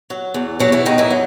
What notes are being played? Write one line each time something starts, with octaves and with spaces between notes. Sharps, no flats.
F#3
E2
B2 F#3 F#4
E3 E4
E2 D#3 D#4
E3 E4
F#3